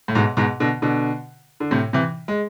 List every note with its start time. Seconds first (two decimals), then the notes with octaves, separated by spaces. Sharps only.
0.08 A2
0.15 G#2 B2
0.37 G#2 B2
0.60 B2 D3
0.82 B2 D3
1.60 D3
1.71 A2 C3
1.93 C3 E3
2.28 G#3